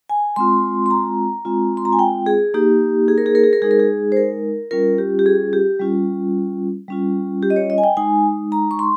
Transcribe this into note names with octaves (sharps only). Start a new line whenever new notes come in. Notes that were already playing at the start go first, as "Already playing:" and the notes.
G#5
G#3 C4 F4 C6
C6
A#5
G#3 C4 F4
C6
A#5
G#5
G5
G#4
A#3 D#4 G4
G#4
A#4
G#4
A#4
G#4
A#4
G#3 D#4 G#4
A#4
G#4
C5
A#4
G3 C#4 F4 A#4
G4
G4
G#4
G4
G3 C#4 F4
G3 C#4 F4
G4
D#5
C#5
D#5
G#5
G5
G#3 D#4 G#5
A#5
C#6
C6